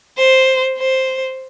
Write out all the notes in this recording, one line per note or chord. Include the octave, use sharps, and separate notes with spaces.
C5
C5